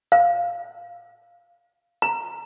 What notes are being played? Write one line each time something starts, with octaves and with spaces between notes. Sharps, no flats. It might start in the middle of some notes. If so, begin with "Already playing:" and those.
F5
A#5